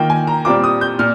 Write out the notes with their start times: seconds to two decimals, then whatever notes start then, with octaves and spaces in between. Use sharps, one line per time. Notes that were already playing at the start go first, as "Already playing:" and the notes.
Already playing: D#3 A#3 F4 G5
0.10 G#5
0.27 A#5
0.45 A#2 G3 C4 F4 D6
0.64 D#6
0.81 G6
0.99 A#2 F6